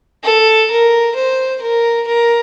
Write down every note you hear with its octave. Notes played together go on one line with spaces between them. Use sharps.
A4
A#4
C5
A#4
A#4